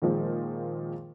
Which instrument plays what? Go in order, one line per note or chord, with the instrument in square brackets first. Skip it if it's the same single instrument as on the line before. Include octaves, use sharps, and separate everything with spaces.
[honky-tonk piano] A#2 D#3 F3 G#3 A#3